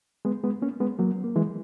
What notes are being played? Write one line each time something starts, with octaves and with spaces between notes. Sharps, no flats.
G#3 B3
G#3 B3
A#3 C#4
G#3 B3
F#3 A#3
A#3
E3 G#3